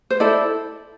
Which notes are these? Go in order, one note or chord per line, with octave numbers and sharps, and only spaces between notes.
C5
E4 A4 D5